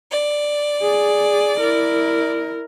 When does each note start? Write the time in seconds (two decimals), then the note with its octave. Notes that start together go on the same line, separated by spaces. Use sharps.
0.11 D5
0.82 G#4
1.60 E4 A#4